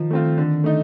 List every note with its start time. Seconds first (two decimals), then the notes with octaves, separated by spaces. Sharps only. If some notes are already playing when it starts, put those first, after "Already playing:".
Already playing: D#3 F3
0.10 A3 C4 F4
0.38 D3
0.64 A3 D#4